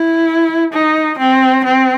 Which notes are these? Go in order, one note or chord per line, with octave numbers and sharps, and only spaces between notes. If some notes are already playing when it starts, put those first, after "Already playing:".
Already playing: E4
D#4
C4
C4